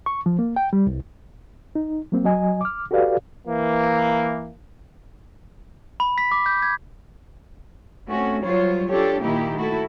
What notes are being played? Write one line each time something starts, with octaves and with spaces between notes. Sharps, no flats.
C#6
F3
A#3
G5
G3
C2
D#4
F#3 A#3 C4
F#3 D#5 G#5
D6 F6
F#4 G4 A4 B4 D5 F5
E3 A#3
B5
B6
D6
G6
G#6
A3 C4 C#4 F#4
F#3 G3 F4 C5 C#5
D4 F4 G4 A4 C#5
A#2 D#3 A#3 D#4 E4 G4
A3 E4 F#4 A4